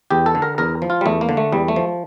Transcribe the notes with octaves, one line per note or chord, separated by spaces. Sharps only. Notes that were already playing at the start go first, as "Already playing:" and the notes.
E2 G4
A4
D3
A#4
E2 A#4
F3
F4
G3
E2 A3
A#3
D3
A3
E2 G3
A3
F3